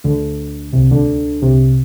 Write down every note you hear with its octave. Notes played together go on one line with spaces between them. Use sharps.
D2 D3
C2 C3
D2 D3
C2 C3